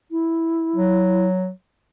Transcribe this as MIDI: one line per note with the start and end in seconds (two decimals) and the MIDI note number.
0.11 1.27 64
0.75 1.50 54